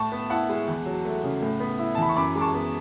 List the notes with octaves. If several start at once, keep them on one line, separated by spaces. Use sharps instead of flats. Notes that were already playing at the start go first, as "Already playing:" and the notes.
Already playing: A2 A5 C#6
B3
E4 F#5 A5
G#3
E2
F#3
A3
C#3
A2
B3
E4
A5
E3 B5
C#6
F#2 B5 D6
G#3 D6
A5 C#6
B3